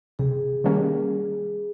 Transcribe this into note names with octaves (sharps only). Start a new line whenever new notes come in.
C3 G#4
D#3 G3 A#3 C#4